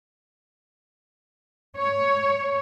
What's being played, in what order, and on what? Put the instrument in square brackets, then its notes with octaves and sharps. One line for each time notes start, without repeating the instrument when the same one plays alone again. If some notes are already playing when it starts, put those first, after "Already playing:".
[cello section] C#5